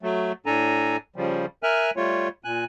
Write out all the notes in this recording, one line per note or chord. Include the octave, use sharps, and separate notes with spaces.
F#3 A3
A2 D4 A4 G#5 A#5
C#3 F3 G3
A#4 E5 G#5 F6 F#6
G3 A3 F4 C#5
A#2 G#5 F#6